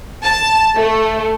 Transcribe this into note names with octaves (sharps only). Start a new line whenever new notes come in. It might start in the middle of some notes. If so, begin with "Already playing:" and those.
A5
A3